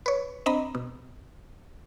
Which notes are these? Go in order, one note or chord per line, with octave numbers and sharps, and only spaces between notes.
B4 C#5
C4 D4 D#5 A#5 B5
B2